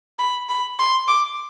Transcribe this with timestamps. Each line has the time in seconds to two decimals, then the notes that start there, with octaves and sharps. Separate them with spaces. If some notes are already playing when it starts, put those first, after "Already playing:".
0.19 B5
0.49 B5
0.79 C6
1.08 D6